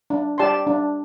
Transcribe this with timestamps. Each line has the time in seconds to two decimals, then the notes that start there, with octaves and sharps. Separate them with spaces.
0.10 D4
0.38 G4 D5 A5 C6
0.67 D4